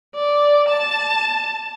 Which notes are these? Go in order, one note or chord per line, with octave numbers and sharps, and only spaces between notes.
D5
A5